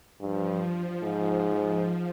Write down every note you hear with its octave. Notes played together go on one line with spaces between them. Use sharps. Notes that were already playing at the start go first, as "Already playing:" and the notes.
G2 F3
G#2